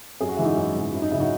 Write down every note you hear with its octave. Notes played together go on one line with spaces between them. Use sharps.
F#2 G#4
F#4
E3 G#3 E4
D#4 F#4
F#2
E3 G#3
F#2 E4
D#4
C#3 F#3 E4
D#4 F#4